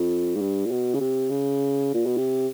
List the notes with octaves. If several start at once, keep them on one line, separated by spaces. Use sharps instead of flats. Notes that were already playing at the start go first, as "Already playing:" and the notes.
Already playing: F2
G#2
G2
A#2
B2
C#3
C3
C#3
A#2
B2
C3